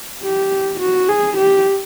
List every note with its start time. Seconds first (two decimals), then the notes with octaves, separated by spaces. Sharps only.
0.23 G4
0.80 F#4
1.09 G#4
1.37 G4